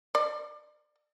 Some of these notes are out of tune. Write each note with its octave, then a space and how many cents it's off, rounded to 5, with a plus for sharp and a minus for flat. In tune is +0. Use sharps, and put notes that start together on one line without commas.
D5 +30